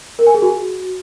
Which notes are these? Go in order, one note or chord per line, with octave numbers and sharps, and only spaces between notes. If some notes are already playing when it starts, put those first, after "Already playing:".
A#4
G#5
G#4
F#4